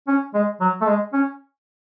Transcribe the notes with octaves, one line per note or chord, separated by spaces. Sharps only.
C#4
G#3
F#3
A3
G#3
C#4